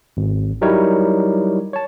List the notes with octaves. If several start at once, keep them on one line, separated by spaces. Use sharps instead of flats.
G#1
F#3 G3 D#4 E4 A#4 C#5
C#5 A5